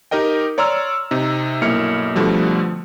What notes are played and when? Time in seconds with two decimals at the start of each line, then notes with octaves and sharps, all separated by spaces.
0.11 D#4 G4 A#4 D#5 G5
0.58 C#5 D5 A#5 C6 E6 F6
1.11 C3 D#4
1.62 B1 G2 A#3 E4 F6 C#7
2.15 B2 D3 F3 G3 A3